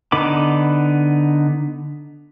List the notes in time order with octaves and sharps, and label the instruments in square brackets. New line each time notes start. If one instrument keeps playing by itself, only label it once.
[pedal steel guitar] D3 B3 D#4 B5 D6